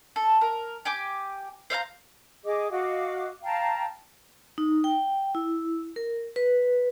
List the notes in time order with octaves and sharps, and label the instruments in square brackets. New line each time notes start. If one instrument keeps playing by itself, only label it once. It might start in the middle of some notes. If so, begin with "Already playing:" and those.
[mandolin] A4
A#4
G4 G#5 D6
C5 E5 F5 A#5
[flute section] G#4 D#5 D6
F#4 D#5 F5 D6
F5 G5 A5 A#5
[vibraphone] D#4
G5
E4
A#4
B4